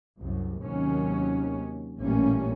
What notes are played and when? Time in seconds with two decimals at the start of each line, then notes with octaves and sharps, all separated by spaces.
0.19 C2 F#2
0.62 D#2 C3 D#3 F#3 C#4
1.98 A1 A#2 G3 A3 A#3 C#4